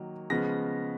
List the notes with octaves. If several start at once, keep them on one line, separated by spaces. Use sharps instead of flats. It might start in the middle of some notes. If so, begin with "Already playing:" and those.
Already playing: D#3 F#3 A#3
C#3 F3 G#3 B3 A#6